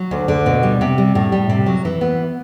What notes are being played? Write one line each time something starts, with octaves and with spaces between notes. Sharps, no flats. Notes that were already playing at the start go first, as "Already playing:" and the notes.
Already playing: F#3
D2
D3
B2
G3
C3
G3
A2
G3
C3
F#3
E3
B3